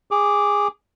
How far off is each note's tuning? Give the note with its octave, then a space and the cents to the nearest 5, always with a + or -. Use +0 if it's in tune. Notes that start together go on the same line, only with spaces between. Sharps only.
G#4 -20 D6 -5